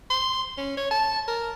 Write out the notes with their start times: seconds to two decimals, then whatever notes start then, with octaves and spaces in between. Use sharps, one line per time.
0.10 C6
0.57 C#4
0.77 C#5
0.91 A5
1.28 A#4